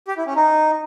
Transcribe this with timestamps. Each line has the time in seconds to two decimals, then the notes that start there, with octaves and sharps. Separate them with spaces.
0.08 G4
0.17 E4
0.27 C#4
0.36 D#4